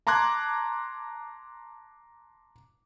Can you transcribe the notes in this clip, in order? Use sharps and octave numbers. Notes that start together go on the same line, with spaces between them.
A5 A#5 C6 D6 F#6 G#6